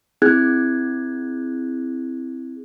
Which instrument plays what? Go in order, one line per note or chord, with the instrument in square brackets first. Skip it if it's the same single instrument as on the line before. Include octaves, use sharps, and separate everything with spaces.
[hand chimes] C4 E4 G#4 F#6 G#6